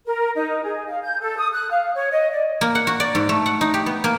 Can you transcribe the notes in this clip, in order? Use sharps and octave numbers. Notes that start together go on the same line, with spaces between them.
A#4
D#4
G#4
F5
G6
A4
D#6
F#6
F5
C#5
D#5
D5
A#3
F#5
F#4
D5
G#2
A3
F#5
D#4
G4
B3
A#3